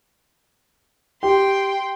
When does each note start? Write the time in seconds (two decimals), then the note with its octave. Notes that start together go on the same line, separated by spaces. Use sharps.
1.23 G4 G5 C6